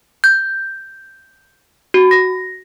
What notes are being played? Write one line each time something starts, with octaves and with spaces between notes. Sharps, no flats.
G6
F#4
A#6